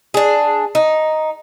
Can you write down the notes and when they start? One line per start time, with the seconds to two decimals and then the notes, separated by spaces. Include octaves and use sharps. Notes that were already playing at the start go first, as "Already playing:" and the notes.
0.14 D4 G#4
0.75 D#4